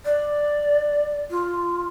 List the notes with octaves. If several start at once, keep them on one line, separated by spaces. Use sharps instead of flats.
D5
F4